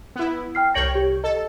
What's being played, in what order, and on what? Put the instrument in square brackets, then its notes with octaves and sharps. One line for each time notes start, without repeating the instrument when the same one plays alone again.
[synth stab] B3 E4
[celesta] G5 F6 C7
[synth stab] C2 C#5 G5 [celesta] A#6 C#7 F#7
[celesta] G4
[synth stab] A4 [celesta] D#5